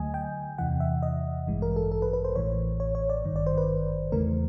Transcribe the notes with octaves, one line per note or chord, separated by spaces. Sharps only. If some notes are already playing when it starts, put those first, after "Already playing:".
Already playing: D2 D3 F#3 A3 D#5 G#5
G5
E2 C3 E3 F#5
E5
D#5
A1 G2 E3 G#3
A#4
A4
A4
B4
B4
C5
A1 A2 E3 C#5
C#5
C#5
D5
G#1 G2 D#3
D5
C5
B4
E2 C#3 E3 A3 A#4